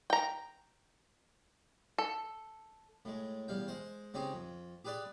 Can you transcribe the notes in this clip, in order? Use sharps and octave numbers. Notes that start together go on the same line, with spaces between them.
G5 A#5
A4
A2 G#3
E2 G3 F5 G5
G#3 C5
C#3 C4 D#4 G4 G#4
F2
G4 G#4 B4 D5 C6